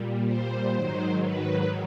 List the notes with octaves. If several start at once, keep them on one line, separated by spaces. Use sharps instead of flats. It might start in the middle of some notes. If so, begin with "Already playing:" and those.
Already playing: A#2 G3
C5
G#2 D#3 F#3
B4